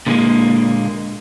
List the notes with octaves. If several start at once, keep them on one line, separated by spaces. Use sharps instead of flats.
A#2 D3 F3 G3 G#3 A#3